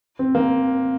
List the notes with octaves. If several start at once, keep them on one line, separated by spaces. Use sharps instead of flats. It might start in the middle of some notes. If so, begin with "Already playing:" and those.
C4
A#3